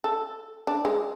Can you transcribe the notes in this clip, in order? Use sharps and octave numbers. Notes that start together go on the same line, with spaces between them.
A4
D4
G#3